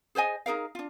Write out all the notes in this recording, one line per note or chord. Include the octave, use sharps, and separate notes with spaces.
G#4 C5 D#5 G#5
D#4 G#4 A#4 F5
D4 F4